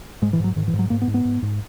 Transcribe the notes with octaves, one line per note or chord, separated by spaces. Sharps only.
G#2 G#3
E3
G#2 F#3
G#2 D#3
E3
G#2
F#3
G#2 A#3
B3
G#2
B3
G#2
G#2